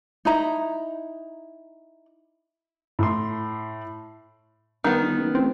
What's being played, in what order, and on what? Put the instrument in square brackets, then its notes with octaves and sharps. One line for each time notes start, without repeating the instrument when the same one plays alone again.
[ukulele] D#4 E4 A#5
[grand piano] A2 C6
[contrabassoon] G2 [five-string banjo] D#3 B3
[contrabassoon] G1
F#1
[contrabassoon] A1 [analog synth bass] C4